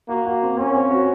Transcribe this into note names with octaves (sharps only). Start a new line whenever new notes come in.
A#3 F#4
F#4
C4
C4 C#4
C4
F#4